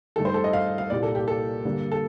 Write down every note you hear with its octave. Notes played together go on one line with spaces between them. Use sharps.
G2 D#3 A3 A4
C5
A4
D#5
F5
F5
F5
C2 A#2 G3 A#3 D5
A4
G4
A4
G2 D3 G3 A#3
A4